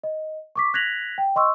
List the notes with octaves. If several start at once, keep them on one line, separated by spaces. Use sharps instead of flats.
D#5
C#6 D6 B6
F#6 G#6 A#6 B6 F7 F#7
G5
D#5 C6 C#6 E6